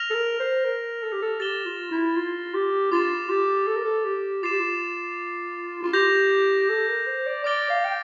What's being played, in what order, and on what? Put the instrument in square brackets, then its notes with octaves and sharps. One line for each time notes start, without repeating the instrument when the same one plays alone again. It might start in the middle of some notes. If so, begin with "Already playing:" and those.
Already playing: [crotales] F6 A#6 F7
[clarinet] A4
A#4
C5
A#4
A4
G4
A4
[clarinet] G4 [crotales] A6 E7 G7
[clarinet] F4
E4
F4
G4
[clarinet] F4 [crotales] D6 A6 E7
[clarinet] G4
A4
A#4
A4
G4
[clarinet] F4 [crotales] D6 A6 C7 E7
[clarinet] G4
F4
F4
[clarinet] G4 [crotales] G6 A#6 F7
[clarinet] A4
A#4
C5
D5
[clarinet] D5 [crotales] D6 F6 A6 D7 G7
[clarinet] F5
G5